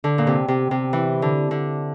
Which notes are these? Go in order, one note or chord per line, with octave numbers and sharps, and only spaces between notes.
D3
A#2
C3
C3
C3
E3
D3
D3